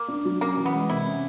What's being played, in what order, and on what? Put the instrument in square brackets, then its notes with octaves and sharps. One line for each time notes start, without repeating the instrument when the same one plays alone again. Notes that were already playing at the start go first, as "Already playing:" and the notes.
Already playing: [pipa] A#3
[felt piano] D4
F#3
[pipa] A#3 [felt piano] C#4
[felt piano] E3
[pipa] B3
[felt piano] G#3
[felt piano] C3 [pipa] E4
[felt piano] C#4